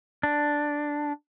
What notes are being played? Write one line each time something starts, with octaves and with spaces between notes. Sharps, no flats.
D4